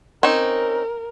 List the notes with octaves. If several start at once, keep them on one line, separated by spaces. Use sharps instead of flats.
C4 C#4 D#4 A#4